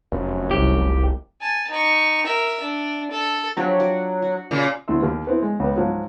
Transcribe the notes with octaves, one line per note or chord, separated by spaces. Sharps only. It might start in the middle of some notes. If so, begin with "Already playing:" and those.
F1 F#2
C2 G4
G#5 A5
D#4 C#6
A#4 E5
D4
A4
F3 F#3 D4 G4
F#4 D5
F#4
A#2 C#3 F4
D2 E4 C6 E6
D#2 G4 A#4
B3 C4 E4
G#3
C#2 B3
G#2 F3 F#3